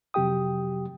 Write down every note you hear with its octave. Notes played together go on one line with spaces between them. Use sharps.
F2 C3 F#3 G4 G5 D#6